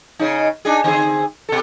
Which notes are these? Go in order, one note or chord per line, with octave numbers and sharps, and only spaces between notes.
C#3 D#4
D4 D#4 G#4
D3 C4 G#4
B2 A4